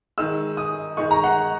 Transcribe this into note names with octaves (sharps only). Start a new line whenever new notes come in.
D#3 G#3 E6
D#6
D#3 G#3 C#6
A#5
F#5